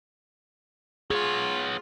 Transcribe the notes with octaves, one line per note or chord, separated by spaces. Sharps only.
B3 F4 G#4 C#5